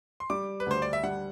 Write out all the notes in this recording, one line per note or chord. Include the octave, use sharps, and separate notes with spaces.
C6
G3 D6
B4
D2 C5
D5
E5
G3 F#5